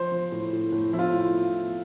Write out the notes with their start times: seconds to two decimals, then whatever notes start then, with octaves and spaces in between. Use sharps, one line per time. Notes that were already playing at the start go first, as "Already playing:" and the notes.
Already playing: F3 C5
0.12 F3
0.32 A2
0.53 A2
0.72 A2
0.93 F3 E4
0.99 F4
1.12 A2